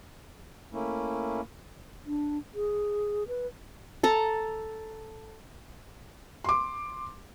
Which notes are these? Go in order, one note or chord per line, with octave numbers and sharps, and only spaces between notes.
A3 A#3 C#4 E4
D4
G#4
B4
A4 A5 A#5
C6 D6